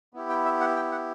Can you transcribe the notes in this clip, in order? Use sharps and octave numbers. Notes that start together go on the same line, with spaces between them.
B3 E4 G4
G5
E5
F#5
G5
F#5